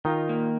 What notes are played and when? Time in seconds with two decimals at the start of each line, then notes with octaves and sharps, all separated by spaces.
0.05 D#3 D#4 F4
0.29 A#3